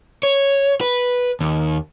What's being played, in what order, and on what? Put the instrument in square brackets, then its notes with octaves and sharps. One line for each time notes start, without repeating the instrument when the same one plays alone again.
[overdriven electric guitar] C#5
B4
D#2